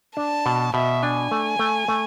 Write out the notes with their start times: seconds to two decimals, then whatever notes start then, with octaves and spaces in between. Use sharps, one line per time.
0.17 D4 A5
0.46 B2
0.74 B2 E5
1.02 D4 G#5
1.31 A3
1.59 A3
1.88 A3